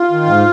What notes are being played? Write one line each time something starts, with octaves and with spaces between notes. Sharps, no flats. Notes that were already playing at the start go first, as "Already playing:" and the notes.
Already playing: F4
D#3
G#2